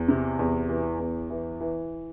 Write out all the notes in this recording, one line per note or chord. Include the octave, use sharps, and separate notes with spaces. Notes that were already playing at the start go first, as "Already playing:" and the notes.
Already playing: E2
C3
E2
E3
E2
E3
E3